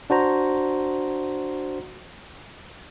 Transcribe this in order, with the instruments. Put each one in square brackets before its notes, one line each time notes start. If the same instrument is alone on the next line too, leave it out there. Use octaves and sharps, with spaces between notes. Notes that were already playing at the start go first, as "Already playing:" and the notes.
[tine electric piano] D4 F#4 C5 A#5